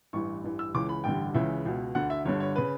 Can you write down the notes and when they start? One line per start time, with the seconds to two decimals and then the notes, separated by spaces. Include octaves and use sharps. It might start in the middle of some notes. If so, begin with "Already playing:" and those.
0.13 A1 G2 E3 C#6
0.44 A1 G2 E3
0.59 E6
0.74 C#2 C#3 E3 D6
0.89 B5
1.04 A1 G2 D3 G5
1.34 C#2 C#3 E3 E5
1.65 C#2 B2
1.95 D2 D3 F#5
2.10 E5
2.25 G1 G2 D3 C#5
2.40 C#5
2.56 C#3 B4